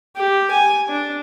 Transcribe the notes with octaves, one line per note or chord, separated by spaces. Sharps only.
G4
G#5
D4